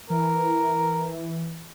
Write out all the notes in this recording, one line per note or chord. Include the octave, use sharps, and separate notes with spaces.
E3 A#4